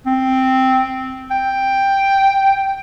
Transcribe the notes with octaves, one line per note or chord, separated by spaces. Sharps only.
C4
G5